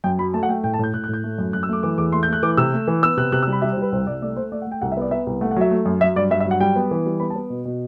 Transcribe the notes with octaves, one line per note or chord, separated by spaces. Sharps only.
F#2 G5
F#3 B5
A3 A5
F#5
A3 G5
A2 G5
A5
A2 G6
A2 F#6
F#6
A2
G6
A3
F#2
F#2 F#6
E6
A3 D6
E3 D6
E2 D6
A3 C6
G6
A3 F#6
E3 D6
C3 E6
A3
E3
B3 E6
C3 F#6
C3 F#6
E6
G3
B5
G3 E5
C5
G3
B4
C2 C5
C2 D5
A3 D5
A3 C5
A3 D5
F#5
A3 G5
C2 F#5
E5
B3 D5
B3 E5
C2
A3 F#5
F#5
F#3 E5
A3
F#2
F#3 E5
G2 D5
G2 E5
E5
F#3
F#5
G3 G5
B3
E3
G3
B3 B5
A5
B3
B2
B2